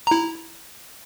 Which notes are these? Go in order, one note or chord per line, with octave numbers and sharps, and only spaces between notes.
E4 A#5